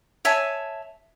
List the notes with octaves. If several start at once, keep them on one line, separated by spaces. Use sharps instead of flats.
C#5 E5 G#5 A5